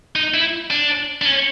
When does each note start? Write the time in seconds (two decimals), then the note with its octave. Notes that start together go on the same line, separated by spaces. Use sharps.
0.16 D#4
0.34 E4
0.70 D4
1.22 D4
1.25 C#4